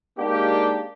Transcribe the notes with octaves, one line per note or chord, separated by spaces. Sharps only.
G#3 A#3 D4 D#4 G4